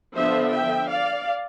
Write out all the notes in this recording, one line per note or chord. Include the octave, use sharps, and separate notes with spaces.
D3 F3 B3 D4 C5 E5
E5 G5
D5 F5